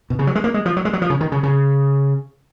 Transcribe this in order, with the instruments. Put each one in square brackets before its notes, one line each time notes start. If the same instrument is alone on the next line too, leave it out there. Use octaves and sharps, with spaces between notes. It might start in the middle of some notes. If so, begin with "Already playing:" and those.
[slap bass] B2
C#3
F#3
G#3
A#3
G#3
F3
F#3
G#3
F#3
F3
C#3
D#3
C#3
C#3